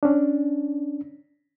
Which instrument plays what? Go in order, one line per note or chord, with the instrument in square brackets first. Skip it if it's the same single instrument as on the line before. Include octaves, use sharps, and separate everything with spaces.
[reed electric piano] C#4 D4